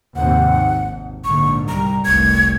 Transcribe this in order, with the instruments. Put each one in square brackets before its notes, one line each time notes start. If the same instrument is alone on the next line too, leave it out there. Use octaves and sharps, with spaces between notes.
[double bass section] D#2 G#2 C3 [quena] F#5
[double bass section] G#1
[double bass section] A#1 G#2 D3 [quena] C#6
[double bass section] C2 G3 [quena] A#5
[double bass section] F1 C2 [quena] G#6